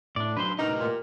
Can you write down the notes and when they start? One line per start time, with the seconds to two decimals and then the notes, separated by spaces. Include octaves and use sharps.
0.16 A2 D4 D5
0.37 F#3 D4 B4 C5 C6
0.59 A2 D#4 G4 A#4 B4 D#5 A#5
0.80 A#2